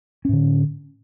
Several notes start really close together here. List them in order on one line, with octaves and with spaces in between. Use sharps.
C#4 A2 D3